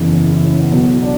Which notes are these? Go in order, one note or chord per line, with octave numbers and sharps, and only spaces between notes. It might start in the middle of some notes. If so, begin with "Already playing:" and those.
Already playing: F#1 E2 C#3 E3
E4
C#4
B3
B1 B2 F#3
D4